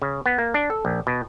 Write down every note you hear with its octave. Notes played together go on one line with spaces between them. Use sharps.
C#3
B3
A#3
D4
A4
A#1
B2